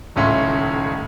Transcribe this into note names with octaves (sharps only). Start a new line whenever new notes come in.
D#1 C#2 A2 C#4 E5 C6